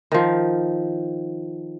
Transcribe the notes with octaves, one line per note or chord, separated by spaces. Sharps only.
D#3 F3